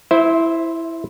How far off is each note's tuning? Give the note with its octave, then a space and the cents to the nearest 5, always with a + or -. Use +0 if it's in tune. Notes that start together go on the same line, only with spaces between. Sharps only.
E4 +0 C5 +0 E5 -30